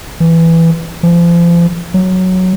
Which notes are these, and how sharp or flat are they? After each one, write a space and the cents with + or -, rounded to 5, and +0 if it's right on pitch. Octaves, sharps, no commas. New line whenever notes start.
E3 +5
F3 -35
F#3 +0